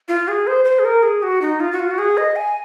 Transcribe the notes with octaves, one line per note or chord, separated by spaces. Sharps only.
F4
G#4
C5
C5
G#4
A#4
G#4
F#4
D#4
F4
F#4
F4
F#4
G#4
D#5
G#5